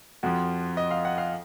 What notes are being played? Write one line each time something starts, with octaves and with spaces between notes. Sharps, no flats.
F2 F3 F#4
D#5
F5
F#5
F5